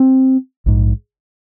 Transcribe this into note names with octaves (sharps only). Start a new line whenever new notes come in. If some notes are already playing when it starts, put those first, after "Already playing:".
Already playing: C4
A#1 G#2